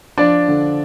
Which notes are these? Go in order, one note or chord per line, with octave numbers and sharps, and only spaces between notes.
F3 D4 D5
D3